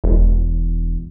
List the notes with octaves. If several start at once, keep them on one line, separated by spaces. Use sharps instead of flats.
E1